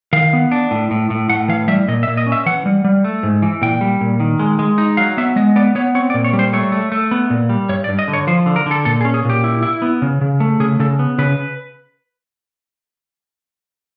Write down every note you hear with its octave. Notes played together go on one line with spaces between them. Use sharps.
D#3 F5
B3
D4
A2
A2
A2
A2 F#5
E3 F5
G3 E5
A#2 D#5
E5
A#2
D#5
C#4
E5
E3 F#5
G3
G3
A3
G#2
E3
A#2 G5
G3
A#2
D#3
G#3
G#3
D#4
F#3 F5
B3 E5
G#3 D#5
B3 D5
B3 C#5
C4 C#5
D5
A#2
C#5
G3
C5
A3 C#5
A3
A3
B3
A#2
G3
G2 C#5
D5
G2
D#5
D3
C#5
F3 C5
D3
A#4
D3 A4
A#2 A4
G#4
C#4
G#4
A#2 G4
E4
E4
B3
C#3
C#3
A3
C#3 G#4
C#3 A4
B3
C#3 B4